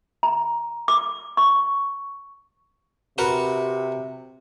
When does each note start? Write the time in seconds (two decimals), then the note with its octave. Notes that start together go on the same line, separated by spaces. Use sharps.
0.23 A#5
0.88 D6
1.37 C#6
3.18 C3 F#4 A#4 B4